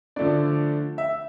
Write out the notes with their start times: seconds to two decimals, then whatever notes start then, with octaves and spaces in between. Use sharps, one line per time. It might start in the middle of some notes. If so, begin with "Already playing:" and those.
0.16 D3 F3 A3 D4 D5
0.98 E5